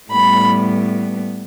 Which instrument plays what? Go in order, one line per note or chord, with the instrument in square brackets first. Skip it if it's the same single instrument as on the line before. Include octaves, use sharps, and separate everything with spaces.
[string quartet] A2 G3 B3 B5